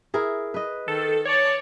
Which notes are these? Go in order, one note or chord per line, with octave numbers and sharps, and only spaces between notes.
E4 G#4 A#4
B4 D#5
D#3 A4
C#5 D5 A5